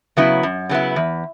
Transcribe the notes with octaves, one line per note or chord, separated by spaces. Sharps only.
C#3 F#3 B3 E4
F#2
C#3 F#3 B3 E4
E2